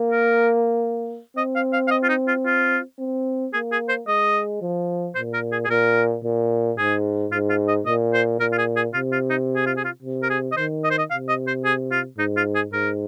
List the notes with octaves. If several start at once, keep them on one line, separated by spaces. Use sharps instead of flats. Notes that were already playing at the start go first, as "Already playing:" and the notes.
Already playing: A#3
A#4
C4 D#5
F5
F5
F5
D#5
F4
D#4
F4
F4
C4
A#3 G#4
G#4
C5
G#3 D#5
F3
A#2 C5
A#4
G#4
G#4
A#2 A#4
A#2
G#2 G#4
G#2 F4
F4
D#5
A#2 D#5
C5
A#2 A#4
F4
G#4
G#4
C3 F4
F4
D#4
G#4
F4
G#4
F4
C3
A#4
G#4
D#5
D#3 C5
D#5
C5
D#5
C3 F5
D#5
C5
G#4
F4
G#2 D#4
F4
G#4
G#2 A#4